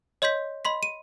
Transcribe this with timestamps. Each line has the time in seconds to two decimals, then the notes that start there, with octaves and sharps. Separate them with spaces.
0.22 C#5 D#5 C6 G6 B6
0.65 D#5 B5 C6 B6
0.83 D#7